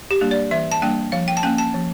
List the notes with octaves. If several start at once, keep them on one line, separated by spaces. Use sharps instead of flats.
G4
G3 A#3 D4
D5
E3 E5
A5
G3 A#3 D4 G5
F3 F5
G5
A5
A#3 C#4 G5
A5
F3